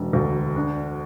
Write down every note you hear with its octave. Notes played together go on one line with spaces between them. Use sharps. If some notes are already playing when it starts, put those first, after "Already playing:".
Already playing: E1 D3
D2
D4